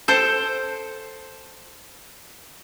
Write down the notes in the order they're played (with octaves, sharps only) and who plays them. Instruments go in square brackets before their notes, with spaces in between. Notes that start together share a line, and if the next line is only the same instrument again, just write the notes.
[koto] A4 C5 G5